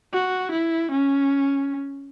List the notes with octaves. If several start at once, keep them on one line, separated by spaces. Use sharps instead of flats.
F#4
E4
C#4